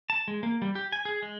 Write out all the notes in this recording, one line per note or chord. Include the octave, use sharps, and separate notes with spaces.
A5
G#3
A#3
G3
G4
G#5
G#4
G#3